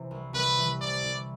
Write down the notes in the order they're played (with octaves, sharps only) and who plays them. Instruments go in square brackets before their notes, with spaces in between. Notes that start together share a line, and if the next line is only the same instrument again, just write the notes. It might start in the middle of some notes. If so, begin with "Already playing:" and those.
Already playing: [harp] C3 E3
C2
[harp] C2 [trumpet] B4
[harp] E3
[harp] C3 [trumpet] D5
[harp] C2